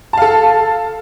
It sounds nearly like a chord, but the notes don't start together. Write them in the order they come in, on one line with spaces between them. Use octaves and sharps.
A5 F5 A4